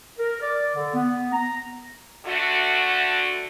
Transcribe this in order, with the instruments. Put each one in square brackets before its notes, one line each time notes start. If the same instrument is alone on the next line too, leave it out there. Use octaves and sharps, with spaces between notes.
[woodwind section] A#4
D5
D3
B3
A#5
[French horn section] D3 A3 F#4